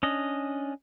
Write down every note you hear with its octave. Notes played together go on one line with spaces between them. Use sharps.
C#4 D4 D#5